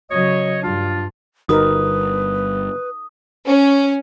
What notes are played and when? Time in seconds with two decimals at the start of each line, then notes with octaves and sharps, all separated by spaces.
0.11 C#3 F#3 C#5 D#5
0.63 G2 G3 D4 F4
1.49 G1 G3 D#4 F#4 A#4 B4 D#6
3.45 C#4